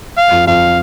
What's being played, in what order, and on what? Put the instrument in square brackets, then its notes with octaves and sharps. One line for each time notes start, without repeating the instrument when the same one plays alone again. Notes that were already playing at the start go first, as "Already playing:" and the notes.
[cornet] F5
[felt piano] F2
[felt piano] F2 [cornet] F5